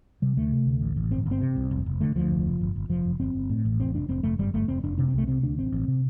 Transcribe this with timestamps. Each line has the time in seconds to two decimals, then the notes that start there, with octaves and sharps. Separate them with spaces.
0.22 C3 G3
0.37 D2 A3
0.52 C3
0.66 D2
0.81 A1
0.96 A1
1.11 G1 C4
1.26 G1
1.31 C4
1.41 C3
1.56 C2
1.71 F1
1.86 F1
2.01 D3 A3
2.16 D2 F3
2.30 F1
2.46 F1
2.61 G1
2.76 G1
2.89 F1 F3
3.05 F1
3.20 G1 C4
3.35 G1
3.50 A2
3.65 A1
3.79 F1 C4
3.94 F1 D4
4.08 F1 C4
4.23 F1 A3
4.39 G1 G3
4.54 G1 A3
4.68 F1 C4
4.83 F1 D4
4.98 C3 D4
5.08 C4
5.13 C2 A3
5.28 C3 C4
5.43 D2 D4
5.58 A1 C4
5.72 A1
5.88 C3